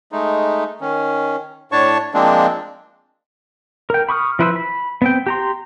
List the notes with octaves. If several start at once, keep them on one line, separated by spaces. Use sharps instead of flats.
G#3 A3 D#4
D#3 C#4
A2 D4 C#5 A5 C#6
F3 G#3 A#3 C4 D4
A#4 G5
B5 C#6 D#6 F6
F3 E4 B4 C5 E6
B5
B3 C4 G5
G4 A#5 C6